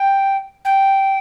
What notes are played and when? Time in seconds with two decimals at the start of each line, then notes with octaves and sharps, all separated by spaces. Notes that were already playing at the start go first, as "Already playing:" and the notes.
Already playing: G5
0.65 G5